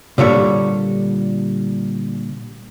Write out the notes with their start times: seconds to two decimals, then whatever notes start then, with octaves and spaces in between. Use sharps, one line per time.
0.18 A#2 D3 G3 C#5